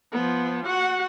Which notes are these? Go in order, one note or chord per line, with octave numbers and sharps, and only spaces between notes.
F3 B3
F#4 F#5